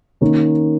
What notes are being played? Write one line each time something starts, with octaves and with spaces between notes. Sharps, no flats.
D#3 A#3 C#4